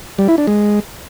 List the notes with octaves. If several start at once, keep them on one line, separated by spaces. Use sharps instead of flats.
G3
E4
D4
G#3